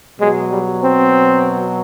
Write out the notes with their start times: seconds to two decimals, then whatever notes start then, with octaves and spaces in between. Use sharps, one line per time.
0.19 B2 F#3 G#3
0.51 G3
0.84 C4